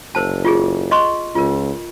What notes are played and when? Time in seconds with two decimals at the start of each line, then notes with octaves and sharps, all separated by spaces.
0.15 F#1 A#4 C5 A5
0.45 F4 G4 G#4
0.91 D#5 C6 C#6
1.35 C#2 F4 A#4